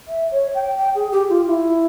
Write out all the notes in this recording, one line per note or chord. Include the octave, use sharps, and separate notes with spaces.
E5
C#5
G5
G5
G#4
G4
F4
E4